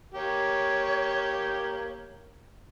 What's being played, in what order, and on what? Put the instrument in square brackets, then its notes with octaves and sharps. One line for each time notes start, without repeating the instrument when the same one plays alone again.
[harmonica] A#3 G4 [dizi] C#5